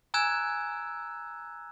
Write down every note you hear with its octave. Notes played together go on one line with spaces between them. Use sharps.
G#5 A#5 E6 F#6 G#6 E7